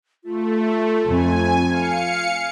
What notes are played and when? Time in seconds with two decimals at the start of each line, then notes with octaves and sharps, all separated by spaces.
0.24 A3 F4
1.07 F2 G#5
1.69 F5 C#7